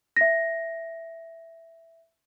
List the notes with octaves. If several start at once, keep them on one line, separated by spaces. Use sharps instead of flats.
E5 A#6